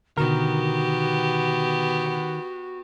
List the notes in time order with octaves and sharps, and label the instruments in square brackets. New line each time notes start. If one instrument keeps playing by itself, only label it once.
[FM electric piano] B2 D3 [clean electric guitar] D#3 A#4 [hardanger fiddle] B3 G4 [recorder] F#4